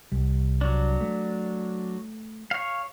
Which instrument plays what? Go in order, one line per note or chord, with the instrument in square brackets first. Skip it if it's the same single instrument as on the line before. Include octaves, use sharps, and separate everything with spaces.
[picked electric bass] C2 G3
[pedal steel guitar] F#3 D4
[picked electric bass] A3
[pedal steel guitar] C#5 F5